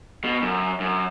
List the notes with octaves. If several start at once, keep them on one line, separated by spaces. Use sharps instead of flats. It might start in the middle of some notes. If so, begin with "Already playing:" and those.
B2
F#2
F#2